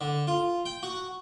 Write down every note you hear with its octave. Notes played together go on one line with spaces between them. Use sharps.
D3
F4
G5
F#4